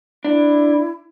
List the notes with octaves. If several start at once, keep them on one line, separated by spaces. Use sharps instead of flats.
D4 E4